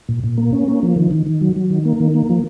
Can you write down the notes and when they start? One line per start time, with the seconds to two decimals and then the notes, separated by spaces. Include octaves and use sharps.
0.09 A#2
0.24 A#2
0.38 A#3
0.53 C#4
0.68 A#3
0.83 F3
0.96 D#3
1.11 D#3
1.26 D#3
1.41 F#3
1.56 F#3
1.70 D#3
1.85 A#3
2.00 D#3
2.14 A#3
2.29 F3